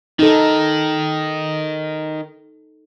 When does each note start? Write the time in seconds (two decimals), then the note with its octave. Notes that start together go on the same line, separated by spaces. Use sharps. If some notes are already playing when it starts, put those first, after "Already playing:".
0.19 D#3 D#4 A4